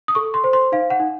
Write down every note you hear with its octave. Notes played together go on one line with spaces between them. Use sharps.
D#6
A4 C#6
C6
C5
C6
D#4 F5
F#5
D#4